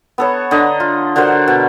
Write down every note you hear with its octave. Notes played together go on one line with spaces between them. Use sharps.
B3 A4 C#5
D3 D#5 A#5
F4
D3 F#4 A#4 C5
B2